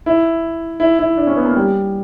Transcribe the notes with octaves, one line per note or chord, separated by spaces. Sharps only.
E4
E4
E4
D4
C#4
B3
A#3
G3